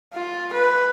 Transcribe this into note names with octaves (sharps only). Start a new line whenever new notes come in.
F4
B4